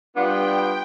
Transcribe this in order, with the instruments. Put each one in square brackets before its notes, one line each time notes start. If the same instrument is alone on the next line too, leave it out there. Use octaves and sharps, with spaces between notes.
[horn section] G3 B3 D4 F4 [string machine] G5